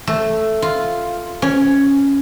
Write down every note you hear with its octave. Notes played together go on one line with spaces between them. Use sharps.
A3
F4
C#4